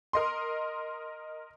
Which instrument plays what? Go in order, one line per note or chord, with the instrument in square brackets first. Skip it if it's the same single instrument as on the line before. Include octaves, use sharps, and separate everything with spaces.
[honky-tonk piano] A#4 D#5 C6